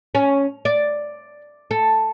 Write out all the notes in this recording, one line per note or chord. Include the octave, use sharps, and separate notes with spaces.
C#4
D5
A4